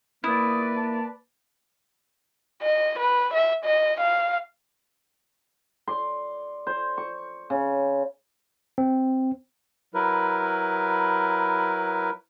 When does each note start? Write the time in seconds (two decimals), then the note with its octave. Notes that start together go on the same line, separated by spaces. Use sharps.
0.24 A#3 E4 B4 D5 D#6
0.76 A5
2.62 D#5
2.99 B4
3.34 E5
3.65 D#5
4.00 F5
5.87 D5 C6
6.67 C5
6.98 C#6
7.50 C#3
8.78 C4
9.94 F#3 E4 A#4 B4